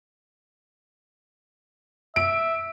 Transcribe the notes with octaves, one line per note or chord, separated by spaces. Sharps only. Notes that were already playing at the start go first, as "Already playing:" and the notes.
E5 D7